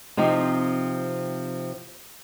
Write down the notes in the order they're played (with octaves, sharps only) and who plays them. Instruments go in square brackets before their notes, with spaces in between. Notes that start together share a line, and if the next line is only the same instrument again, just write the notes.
[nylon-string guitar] C3 F3 C4 D#4